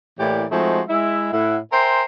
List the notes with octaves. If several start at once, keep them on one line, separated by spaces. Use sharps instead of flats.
A2 E3 A#3 G4 D5
F3 G#3 A3 C4 D#4 F#4
G#3 E4 E5
A2 E4 F#5
A#4 C5 E5 G5 G#5 C6